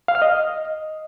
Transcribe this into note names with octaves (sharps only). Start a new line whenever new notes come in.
F5
F6
D#5